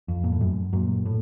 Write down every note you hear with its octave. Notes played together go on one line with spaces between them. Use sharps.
F2
A#2
A2
F#2
F#2 A#2
A2